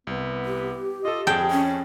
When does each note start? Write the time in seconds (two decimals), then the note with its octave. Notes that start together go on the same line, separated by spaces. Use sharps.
0.07 C2 B3
0.45 G4
1.05 F4 A4 D#5
1.27 F2 G#4 G5 A5
1.51 C#4